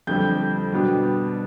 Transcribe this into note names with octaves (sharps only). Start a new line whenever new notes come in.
F2 D3 G3 G6
B2 G3 B3 D4